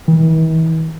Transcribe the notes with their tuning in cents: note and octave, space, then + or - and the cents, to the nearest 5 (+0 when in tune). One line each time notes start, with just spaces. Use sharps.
E3 -45